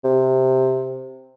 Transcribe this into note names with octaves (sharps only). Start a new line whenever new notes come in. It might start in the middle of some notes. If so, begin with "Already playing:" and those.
C3